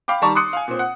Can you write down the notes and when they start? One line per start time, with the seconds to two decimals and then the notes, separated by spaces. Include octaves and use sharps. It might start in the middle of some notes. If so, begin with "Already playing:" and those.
0.08 F5 G5 B5 D6
0.22 D#3 G3 D5 A5 A#5 C#6
0.35 C6 D6 D#6 F#6 C#7
0.53 F5 G#5
0.68 A#2 C4
0.79 F#5